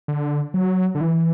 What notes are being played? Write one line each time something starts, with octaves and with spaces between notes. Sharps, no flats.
D3
F#3
D3
E3